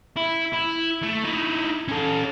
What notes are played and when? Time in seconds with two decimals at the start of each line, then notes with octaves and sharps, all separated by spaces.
0.16 E4
0.53 E4
1.03 A3
1.24 D#4 E4
1.88 C#4 A4